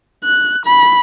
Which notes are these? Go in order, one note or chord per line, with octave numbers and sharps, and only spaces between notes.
F#6
B5